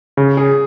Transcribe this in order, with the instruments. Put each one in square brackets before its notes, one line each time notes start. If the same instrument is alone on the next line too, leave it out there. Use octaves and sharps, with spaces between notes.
[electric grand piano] C#3
[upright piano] G#4